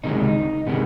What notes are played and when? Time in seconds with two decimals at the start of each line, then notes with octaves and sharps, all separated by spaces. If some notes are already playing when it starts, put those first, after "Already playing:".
0.04 C#2 C3 D#3 G#3 D#4
0.67 C3 D#3 G#3 B3